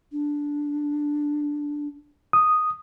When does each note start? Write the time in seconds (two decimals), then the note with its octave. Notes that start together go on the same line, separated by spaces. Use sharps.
0.12 D4
2.33 D#6